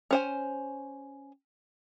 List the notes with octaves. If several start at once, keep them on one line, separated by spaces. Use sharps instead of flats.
C#4 C5 G#5